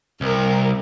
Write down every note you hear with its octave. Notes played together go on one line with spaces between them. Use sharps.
C2 A#4